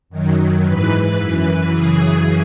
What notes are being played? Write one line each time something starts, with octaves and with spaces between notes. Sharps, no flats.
F#2 D#3 F#3
G#2 E3 B4
F#2 E3 B4
F#2 C#3 E3 G#4